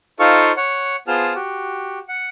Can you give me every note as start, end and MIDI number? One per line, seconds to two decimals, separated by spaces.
0.20 0.52 63
0.20 0.52 65
0.20 0.52 69
0.20 0.52 72
0.20 0.52 77
0.20 0.52 85
0.57 0.96 73
0.57 0.96 78
1.07 1.34 59
1.07 1.34 65
1.07 1.34 68
1.07 1.34 72
1.07 1.34 81
1.07 1.34 89
1.35 1.99 66
1.35 1.99 67
2.08 2.29 78